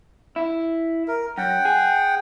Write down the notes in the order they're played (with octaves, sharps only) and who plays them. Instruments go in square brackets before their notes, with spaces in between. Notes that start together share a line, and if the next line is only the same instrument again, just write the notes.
[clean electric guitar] E4
[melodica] A#4
[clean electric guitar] F#2 [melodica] F#5 G5
[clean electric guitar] G#4